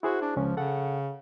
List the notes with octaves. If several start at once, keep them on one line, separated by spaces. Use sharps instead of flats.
E4 F#4 G#4 C5
D4
C#2 F3 C#4
C#3 A4 F#5